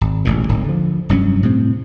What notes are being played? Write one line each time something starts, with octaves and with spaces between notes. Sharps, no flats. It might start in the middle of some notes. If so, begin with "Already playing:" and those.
G#1
E1 A1 A#2
D1 G#1 D#3
D3 F3
F1 G2 F#3 C#4
A2 C3 C4